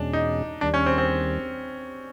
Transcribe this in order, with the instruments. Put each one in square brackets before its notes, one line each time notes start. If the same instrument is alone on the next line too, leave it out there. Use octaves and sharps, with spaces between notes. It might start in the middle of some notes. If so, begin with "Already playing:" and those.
Already playing: [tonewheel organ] E2 B2 G#3 C#4 [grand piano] D4
[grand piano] D#4
[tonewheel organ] D#2 D#3 G3 [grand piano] D4
[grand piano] C#4
C4
C4